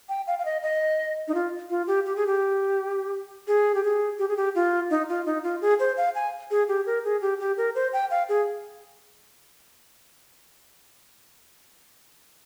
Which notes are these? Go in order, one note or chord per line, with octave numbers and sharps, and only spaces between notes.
G5
F5
F5
D#5
D#5
D#4
F4
F4
G4
G4
G#4
G4
G#4
G4
G#4
G4
G#4
G4
F4
D#4
F4
D#4
F4
G#4
C5
F5
G#5
G#4
G4
A#4
G#4
G4
G4
A#4
C5
G5
F5
G#4